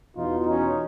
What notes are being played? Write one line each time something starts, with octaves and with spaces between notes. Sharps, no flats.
E2 B2 D#4 F4
C#4 D#4